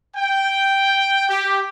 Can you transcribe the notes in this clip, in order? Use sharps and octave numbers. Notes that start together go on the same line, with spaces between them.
G5
G4